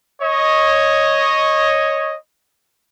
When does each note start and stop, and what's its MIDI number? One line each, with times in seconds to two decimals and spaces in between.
0.22 2.15 73
0.22 2.15 75